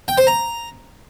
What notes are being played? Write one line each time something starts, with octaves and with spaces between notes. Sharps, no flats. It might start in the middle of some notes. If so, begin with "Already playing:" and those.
G5
C5
A#5